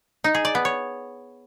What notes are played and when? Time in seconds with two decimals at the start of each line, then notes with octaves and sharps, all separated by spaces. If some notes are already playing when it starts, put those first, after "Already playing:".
0.24 D#4
0.35 G#4
0.45 D5
0.55 B3
0.65 C#5